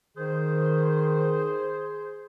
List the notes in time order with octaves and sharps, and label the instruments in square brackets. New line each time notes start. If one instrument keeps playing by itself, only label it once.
[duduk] D#3 [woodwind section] G#4 C5